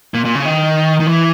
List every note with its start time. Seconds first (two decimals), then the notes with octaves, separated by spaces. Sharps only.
0.14 A#2
0.25 A#2
0.35 C#3
0.45 D#3
1.00 D#3
1.07 E3